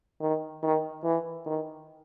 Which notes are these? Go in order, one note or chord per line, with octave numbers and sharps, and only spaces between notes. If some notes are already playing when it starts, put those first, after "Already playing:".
D#3
D#3
E3
D#3